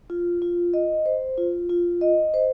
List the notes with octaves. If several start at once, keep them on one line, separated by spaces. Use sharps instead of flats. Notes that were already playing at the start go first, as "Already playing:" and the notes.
F4
F4
D#5
C5
F4
F4
D#5
C5